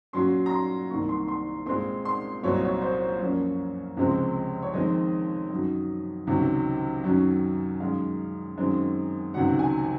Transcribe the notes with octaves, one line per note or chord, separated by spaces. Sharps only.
A#2 F#3 C#4 C6
A#5
C6
C2 C3 D#3 A#3 C#6
C6
C6
A#2 G#3 C4 C6
C6
C2 A#2 F#3 C4 C#5
D#5
C#5
C5
F#2 F3 A#3 C#4 C#5
C#2 C3 F3 G#3 C4
C#5
F2 D#3 G#3 C4 D#5
F#2 D#3 F#3
C#2 C3 D#3 F#3 C#4
F#2 D#3 F#3 C#4
F#2 D#3 G#3 F5
F#2 D#3 G#3 C4
C#2 C3 D#3 F#3 F#5
G#5